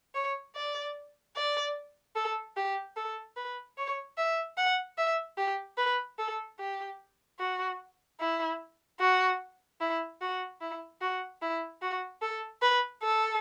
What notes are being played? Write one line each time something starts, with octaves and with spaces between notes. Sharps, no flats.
C#5
D5
D5
A4
G4
A4
B4
C#5
E5
F#5
E5
G4
B4
A4
G4
F#4
E4
F#4
E4
F#4
E4
F#4
E4
F#4
A4
B4
A4